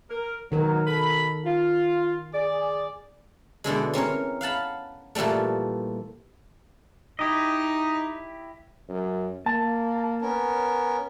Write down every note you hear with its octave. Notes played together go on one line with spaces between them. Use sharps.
A#4
G#2 B2 D#3 F#3 A#4
B2 A4 B5
F4
G#4 D5
B2 D3 E3 G#3
C4 C#4 A#4 C#5
F5 F#5 A5 B5
A#2 E3 F3 G3 A3
D#4 E4 G4 D#5
F#2
A#3 A5
B3 C#4 A#4